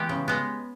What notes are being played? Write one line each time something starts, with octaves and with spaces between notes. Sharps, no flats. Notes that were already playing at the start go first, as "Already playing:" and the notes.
Already playing: E3 G#3 B3 G4
C#3
G#3 B3